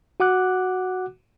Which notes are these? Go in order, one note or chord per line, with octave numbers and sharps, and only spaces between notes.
F#4 F#5 D6 F#6